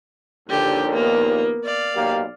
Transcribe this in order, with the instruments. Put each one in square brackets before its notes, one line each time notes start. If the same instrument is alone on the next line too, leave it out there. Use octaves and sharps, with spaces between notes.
[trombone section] A#1 D#2 [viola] D3 G4
[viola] A#3 B3
D5 F5
[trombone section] B1 A#3 G4